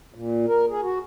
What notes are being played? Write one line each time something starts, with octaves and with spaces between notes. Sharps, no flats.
A#2
A#4
G#4
F#4